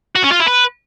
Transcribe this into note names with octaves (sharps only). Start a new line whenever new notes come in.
F#4
C#4
F4
E4
B4